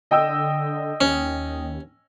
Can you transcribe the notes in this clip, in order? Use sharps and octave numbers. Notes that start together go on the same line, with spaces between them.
D3 D#5 G5 E6
D#2 C#4